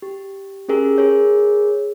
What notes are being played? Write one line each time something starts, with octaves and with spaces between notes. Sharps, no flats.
G4
C#4 G4 G#4 A#4
G#4 A#4 C#5